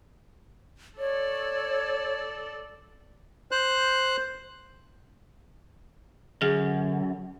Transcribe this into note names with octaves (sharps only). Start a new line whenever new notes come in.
A4 C#5 D5
C5 F#6
F#2 D3 G#4